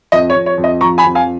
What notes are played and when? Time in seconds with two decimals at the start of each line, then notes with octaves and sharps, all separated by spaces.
0.12 F2 D#5
0.30 C#5
0.34 F2
0.46 C#5
0.57 F2
0.64 D#5
0.81 F3 A#5 C#6
0.98 G#5 B5
1.04 F2
1.15 F5 G#5